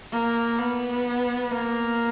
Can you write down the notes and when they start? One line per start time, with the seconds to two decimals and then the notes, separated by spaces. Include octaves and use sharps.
0.11 A#3
0.58 B3
1.51 A#3